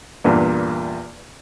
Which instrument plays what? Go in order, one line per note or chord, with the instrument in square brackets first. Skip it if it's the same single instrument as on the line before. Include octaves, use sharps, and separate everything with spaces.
[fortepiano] E2 G2 A#2